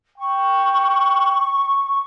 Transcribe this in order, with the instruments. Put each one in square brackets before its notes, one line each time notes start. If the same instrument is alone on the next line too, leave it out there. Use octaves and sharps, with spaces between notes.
[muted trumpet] G5 [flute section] C#6